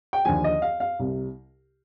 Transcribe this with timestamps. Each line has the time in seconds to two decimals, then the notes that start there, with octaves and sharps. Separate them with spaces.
0.13 G5
0.25 D#2 D3 F3 G#5
0.44 D#5
0.62 F5
0.80 F5
0.99 C2 C3 G3